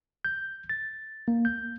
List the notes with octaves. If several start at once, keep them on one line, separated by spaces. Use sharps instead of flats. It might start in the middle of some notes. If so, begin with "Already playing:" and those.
G6
A6
A#3
G6